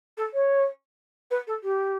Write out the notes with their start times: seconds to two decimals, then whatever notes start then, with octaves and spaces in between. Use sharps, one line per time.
0.17 A4
0.33 C#5
1.30 B4
1.47 A4
1.63 G4